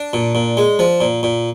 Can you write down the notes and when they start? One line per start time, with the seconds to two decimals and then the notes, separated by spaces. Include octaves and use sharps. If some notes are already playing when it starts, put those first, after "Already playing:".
Already playing: D4
0.13 A#2
0.35 A#2
0.57 G#3
0.79 F3
1.01 A#2
1.23 A#2